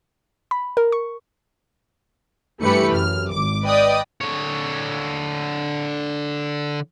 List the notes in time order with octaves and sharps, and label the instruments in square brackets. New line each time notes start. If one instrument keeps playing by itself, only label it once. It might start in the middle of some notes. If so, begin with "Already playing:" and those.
[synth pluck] B5
A#4
C#6
[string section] G2 E3 A3 G4 B4 C#7
F#2 F6
G#1 D6
B4 D5 D#5 G5 D#6
[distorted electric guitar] D3 C#5